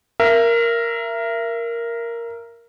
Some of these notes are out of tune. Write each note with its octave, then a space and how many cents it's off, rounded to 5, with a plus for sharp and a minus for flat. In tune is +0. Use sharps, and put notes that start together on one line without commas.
A#4 +0 E5 +35